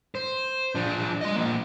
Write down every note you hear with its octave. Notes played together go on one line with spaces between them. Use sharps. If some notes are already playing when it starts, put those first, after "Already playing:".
C5
F3 D4
D#5 C6
F3 A#3